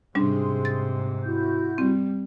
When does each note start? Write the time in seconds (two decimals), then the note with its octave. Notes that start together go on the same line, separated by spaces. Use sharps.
0.15 G#2 C3 G3 C#4 D4 G#4 C6
0.65 A6
1.23 E4 F#4 G6
1.78 G3 C4